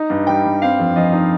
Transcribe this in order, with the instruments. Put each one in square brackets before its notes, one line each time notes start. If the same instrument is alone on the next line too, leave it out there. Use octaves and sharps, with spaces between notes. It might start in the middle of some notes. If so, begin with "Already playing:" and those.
Already playing: [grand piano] D#4 A#5
G2
G3 G5
G2
C4 F5
F2
F3 D#5
D#4